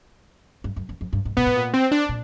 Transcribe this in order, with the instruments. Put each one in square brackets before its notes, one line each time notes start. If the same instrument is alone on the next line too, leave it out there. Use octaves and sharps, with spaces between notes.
[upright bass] G2
F#2
E2
F2
G2
G#2
[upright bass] A#2 [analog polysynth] B3
[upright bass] A2
A#2
[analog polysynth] C4
D4
[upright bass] A#2